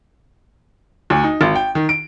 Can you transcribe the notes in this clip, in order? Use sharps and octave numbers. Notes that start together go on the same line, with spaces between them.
D2
D#4
G#1
G5
D#3
D7